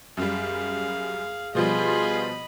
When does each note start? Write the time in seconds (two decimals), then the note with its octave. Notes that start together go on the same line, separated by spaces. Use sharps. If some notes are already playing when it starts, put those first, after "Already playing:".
0.17 F#2 G3 G#4 F5
1.55 B2 F3 G3 F4 G#4 D#5 B5